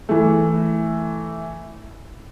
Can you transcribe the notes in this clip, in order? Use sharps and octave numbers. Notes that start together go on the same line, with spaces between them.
E3 A3